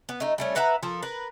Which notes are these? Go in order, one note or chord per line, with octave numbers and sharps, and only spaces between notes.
B3
A3 D#4
G3 A3 C#4
B4 E5 F#5 A#5
F3 A4 A#4
A#4 B4